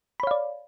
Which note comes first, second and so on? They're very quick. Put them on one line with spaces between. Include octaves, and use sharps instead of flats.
B5 C#5 F5 D5